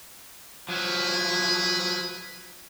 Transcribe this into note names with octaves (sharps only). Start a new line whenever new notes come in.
F3 F#3 G#4 B4 G#5